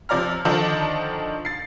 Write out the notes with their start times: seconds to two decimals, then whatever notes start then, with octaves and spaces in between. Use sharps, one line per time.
0.09 C3 F3 D5 A#5 F6
0.45 D3 D#3 F3 D4 D#4 A4
1.45 A6 C7